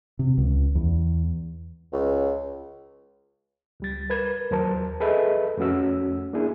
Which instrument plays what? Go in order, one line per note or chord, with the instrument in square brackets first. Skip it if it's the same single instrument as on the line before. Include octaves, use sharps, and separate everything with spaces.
[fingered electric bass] C3
C#2
E2
[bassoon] C#2
[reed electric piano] C#2 G3 A6
A#4 B4 G#6
D#2 F#3 A#4 C5 A5
G#4 A4 B4 D#5 E5
F2 A3 C#4 F#4 E6
A#3 D4 E4 G#4